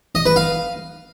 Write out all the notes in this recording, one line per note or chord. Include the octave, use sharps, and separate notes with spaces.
D#5
B4
F5